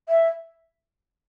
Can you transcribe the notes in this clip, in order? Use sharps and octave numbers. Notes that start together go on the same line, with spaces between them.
E5